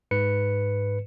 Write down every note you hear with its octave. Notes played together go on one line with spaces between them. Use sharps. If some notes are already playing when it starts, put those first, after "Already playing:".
G#2 B4 C#7